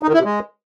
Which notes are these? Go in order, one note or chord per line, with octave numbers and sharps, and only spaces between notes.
D#4
D#3
E4
C3
G#3